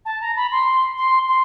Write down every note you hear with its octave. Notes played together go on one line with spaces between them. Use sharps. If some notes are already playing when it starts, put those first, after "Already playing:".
A5
A#5
B5
C6
C6
C6